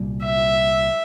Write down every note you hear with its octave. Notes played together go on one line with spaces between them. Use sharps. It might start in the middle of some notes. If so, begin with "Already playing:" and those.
Already playing: C2 A#2 G3
E5